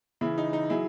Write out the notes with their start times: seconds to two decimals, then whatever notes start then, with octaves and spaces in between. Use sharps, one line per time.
0.21 C#3 E3 E4
0.38 D#4
0.53 D#4
0.70 F#3 E4 G#4